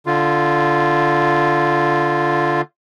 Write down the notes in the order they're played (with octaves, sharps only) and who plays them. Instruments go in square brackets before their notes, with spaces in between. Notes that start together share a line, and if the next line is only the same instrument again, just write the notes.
[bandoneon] D3 F4